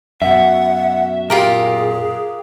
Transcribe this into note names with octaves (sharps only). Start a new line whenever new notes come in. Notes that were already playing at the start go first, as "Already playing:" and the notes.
F#2 B2 E5 F#5
A#2 F4 G4 G#4 A#4